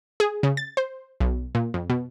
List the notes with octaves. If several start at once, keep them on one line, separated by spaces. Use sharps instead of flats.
G#4
C#3
A6
C5
B1
A#2
F2
B2